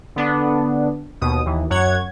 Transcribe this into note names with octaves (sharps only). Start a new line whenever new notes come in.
D3 B3 D4
D#2 B2 D#6
D#2 E3
F#2 C#5 F#5 G#6